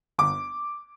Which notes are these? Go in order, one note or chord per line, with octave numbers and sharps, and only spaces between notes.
G1 D6